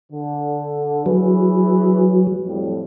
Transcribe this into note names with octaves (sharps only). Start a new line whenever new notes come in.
D3
E3 F#3 G#4 B4
F2 A2 G3